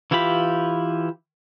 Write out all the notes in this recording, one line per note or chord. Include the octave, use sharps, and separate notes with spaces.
E3 E4 F4 G4 B5